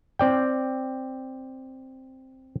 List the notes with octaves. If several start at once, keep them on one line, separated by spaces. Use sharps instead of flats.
C4 D5 G5